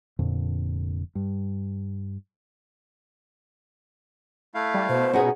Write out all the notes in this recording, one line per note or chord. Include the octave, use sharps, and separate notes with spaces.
F1 F2 A#2 D3
G2
A3 E4 F5
G3
B2 C5
C#4 D#4 F#4 G#4